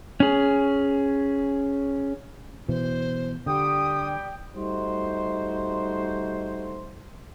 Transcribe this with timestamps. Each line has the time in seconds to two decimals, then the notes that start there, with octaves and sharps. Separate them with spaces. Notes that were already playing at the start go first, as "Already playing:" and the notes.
0.20 C#4 G#4
2.69 B2 E3 C5
3.46 D3 G3 G4 G5 D#6
4.55 G3 A3 D#4 F#4 C5